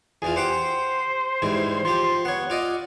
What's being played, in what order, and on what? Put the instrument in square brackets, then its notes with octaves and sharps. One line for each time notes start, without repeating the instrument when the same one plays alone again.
[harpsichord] E2 E3 F4 [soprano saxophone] G#4
[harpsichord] G4 F#5 G5 [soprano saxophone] C5
[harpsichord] G#2 E3 G3
[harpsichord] F3 G4 [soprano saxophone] C6
[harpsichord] B3 C#5 [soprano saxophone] F#5
[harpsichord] F4 D5 D#5